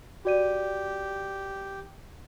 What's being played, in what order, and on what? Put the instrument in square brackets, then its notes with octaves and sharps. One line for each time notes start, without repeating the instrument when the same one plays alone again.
[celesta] F#4 D5 D#7 [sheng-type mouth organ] G4